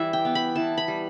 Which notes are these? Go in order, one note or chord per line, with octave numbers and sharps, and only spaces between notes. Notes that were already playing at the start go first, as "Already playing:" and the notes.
Already playing: E3 G3 D5 E5
G5
B3
B5
E3 A5
B5
G3